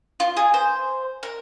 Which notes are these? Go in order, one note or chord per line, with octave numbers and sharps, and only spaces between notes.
F4
G#4
C5
A#4